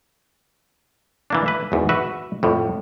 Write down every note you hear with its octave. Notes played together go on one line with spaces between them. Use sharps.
E3 A#3 D4
B4 E5
G#1 E2
F#4 B4 E5
F2 A2 F3